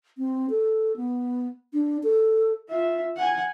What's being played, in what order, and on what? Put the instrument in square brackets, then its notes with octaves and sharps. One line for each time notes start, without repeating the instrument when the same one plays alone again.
[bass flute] C4
A4
B3
D4
A4
[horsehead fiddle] F4 E5
F#5 G#5